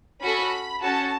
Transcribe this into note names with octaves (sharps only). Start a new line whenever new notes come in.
C#4 F#4 A4 B5
C#4 F#4 A4 A5